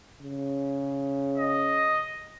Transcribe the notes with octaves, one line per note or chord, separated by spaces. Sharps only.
C#3
D#5